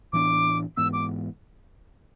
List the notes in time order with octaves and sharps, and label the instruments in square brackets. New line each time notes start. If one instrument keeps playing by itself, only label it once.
[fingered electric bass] A2 E3 B3 D4 [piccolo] D6
[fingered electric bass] G#2 E3 B3 [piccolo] E6
[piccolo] D6